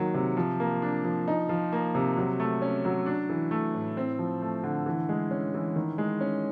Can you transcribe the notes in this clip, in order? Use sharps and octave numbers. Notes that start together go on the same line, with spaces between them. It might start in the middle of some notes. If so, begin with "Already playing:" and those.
Already playing: D#3 F#3 A#3
C3
F3
A#3
D4
F3
D#4
F3
A#3
C3
F#3
A3
C#4
F#3
D4
E3
A3
A2
C4
F3
A3
D3
E3
G#3
C#4
E3
D#3
G#3
C#4